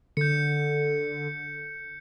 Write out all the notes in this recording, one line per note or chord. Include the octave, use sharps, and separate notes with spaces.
D3 G6 C#7